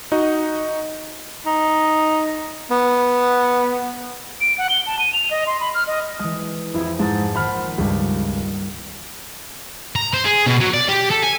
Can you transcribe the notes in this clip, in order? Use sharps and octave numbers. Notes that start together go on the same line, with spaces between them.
D#4 F#4 D#5
D#4
B3
D7
F#5
G7
A5
D#7
F7
D#5
C6
B5
F6
D#5
E3 G#3 D#6
F2 E4 G#4
G#2 G#5 A5 A6
A#1 D#3 C5 F#5 B5 F6
C#2 G2 G3
A#5
C5
G#4
B2
F#3
D5
G4
A4
G#5